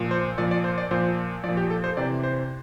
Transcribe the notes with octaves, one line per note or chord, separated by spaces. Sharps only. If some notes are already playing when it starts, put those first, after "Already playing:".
Already playing: A#2 F3
C5
A#2 F3 D5
D5
C5
D5
A#2 F3 C5
A#2 F3 D5
G4
A4
C5
C3 E3 D5
C5